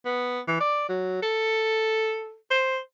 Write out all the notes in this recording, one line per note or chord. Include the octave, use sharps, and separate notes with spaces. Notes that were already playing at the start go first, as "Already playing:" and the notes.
B3
E3
D5
F#3
A4
C5